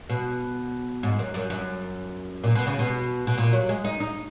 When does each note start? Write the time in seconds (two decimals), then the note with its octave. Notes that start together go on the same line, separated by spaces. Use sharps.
0.09 B2
1.03 G#2
1.19 F#2
1.34 F#2
1.50 F#2
2.44 A#2
2.55 B2
2.67 C#3
2.79 B2
3.27 B2
3.38 A#2
3.53 F#3
3.69 G#3
3.84 D#4
4.00 D#4